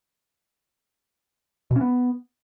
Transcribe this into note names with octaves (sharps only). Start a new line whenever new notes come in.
B2
C#4
B3